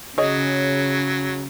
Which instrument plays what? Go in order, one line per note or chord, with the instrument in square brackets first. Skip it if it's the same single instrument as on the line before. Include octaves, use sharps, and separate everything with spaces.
[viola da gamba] C#3 [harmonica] F#3 [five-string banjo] G#4 C#5 D#5